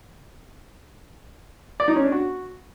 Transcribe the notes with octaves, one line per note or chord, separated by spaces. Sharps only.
D5
D#4
C#4
D4
F#4